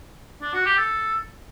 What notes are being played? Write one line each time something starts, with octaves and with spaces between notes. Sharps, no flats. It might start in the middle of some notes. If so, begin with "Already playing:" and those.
D4
F#4
G4
A4